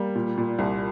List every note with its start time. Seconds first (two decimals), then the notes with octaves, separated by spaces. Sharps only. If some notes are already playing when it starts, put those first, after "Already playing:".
Already playing: G3 A#3
0.15 A#2
0.37 A#2
0.58 C2